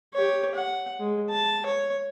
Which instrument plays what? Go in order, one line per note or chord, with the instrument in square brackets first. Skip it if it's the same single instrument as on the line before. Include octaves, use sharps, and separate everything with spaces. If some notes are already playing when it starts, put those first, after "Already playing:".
[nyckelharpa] G4 C#5
F#5
G#3
A5
C#5